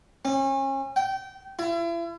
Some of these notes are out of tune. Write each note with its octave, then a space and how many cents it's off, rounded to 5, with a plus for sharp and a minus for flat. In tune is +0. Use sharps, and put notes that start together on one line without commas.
C#4 -35
G5 -25
E4 +40